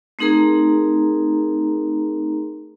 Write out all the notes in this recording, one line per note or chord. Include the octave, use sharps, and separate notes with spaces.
A3 C4 D#4 G#4 A#4 A#5